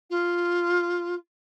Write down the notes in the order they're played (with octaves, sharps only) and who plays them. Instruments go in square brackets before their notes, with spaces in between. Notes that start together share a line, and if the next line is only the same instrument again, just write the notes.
[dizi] F4